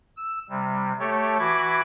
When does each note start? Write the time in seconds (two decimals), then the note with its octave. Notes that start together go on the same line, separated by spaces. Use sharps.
0.17 E6
0.50 C3 G3
1.00 A3 G4 A4 C#5
1.39 E3 F#4 B5 D6 G#6